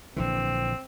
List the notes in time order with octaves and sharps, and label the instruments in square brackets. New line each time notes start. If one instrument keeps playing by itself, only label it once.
[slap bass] A#1 D3 E3 [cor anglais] C4